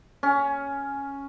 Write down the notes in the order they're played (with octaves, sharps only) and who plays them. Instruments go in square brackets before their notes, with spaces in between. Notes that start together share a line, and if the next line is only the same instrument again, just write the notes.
[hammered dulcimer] C#4